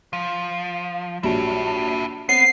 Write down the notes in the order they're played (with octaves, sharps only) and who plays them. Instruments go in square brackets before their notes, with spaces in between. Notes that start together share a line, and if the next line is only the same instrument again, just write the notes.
[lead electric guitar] F3
[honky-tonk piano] A#1 F#3 G3 [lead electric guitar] E4 A5
[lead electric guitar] B3 [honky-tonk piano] C4 [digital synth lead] C7